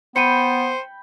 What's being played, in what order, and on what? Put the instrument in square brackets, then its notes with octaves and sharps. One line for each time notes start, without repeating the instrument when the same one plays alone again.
[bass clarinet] B3 [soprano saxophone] C5 [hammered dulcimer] G5 B5 [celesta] C#7 D#7